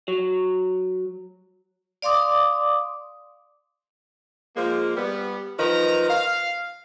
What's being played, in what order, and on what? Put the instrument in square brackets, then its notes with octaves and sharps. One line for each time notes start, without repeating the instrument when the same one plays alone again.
[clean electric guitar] F#3
[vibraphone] D5 F5 C6 D6 D#6
[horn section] F3 G#3 A#3
G3 B3
D#3 F3 B4 A#5
F5